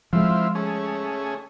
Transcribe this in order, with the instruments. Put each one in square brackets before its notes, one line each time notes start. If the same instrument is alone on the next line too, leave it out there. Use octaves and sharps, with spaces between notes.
[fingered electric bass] F3 G#3 [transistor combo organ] C4 E4 F4
[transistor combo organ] A3 C#4 G#4